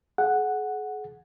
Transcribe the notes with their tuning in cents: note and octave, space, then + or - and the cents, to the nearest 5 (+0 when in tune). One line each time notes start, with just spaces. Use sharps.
G#4 +40 F#5 +0